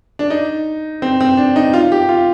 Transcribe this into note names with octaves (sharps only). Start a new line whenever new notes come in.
D4
D#4
C4
C4
D4
D#4
F4
G4
F4